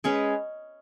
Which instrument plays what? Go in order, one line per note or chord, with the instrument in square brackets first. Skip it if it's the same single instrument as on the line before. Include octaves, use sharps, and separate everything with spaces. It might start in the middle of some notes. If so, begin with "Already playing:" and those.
[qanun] G#3 C#4 G#4 B4